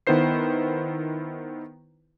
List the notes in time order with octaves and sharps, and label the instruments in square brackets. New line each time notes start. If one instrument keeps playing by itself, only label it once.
[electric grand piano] D#3 B3 E4 B4 C5 C7